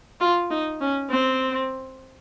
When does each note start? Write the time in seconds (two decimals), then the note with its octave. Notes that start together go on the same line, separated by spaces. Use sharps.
0.20 F4
0.50 D#4
0.81 C#4
1.10 C4